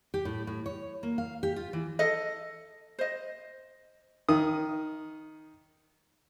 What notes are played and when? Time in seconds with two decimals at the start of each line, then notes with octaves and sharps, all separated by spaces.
0.14 G4
0.25 A2
0.47 A2
0.66 C#5
1.03 A#3
1.18 F5
1.43 G4
1.56 F4
1.73 E3
1.99 A4 D#5
2.99 C5 D#5
4.29 D#3 D#6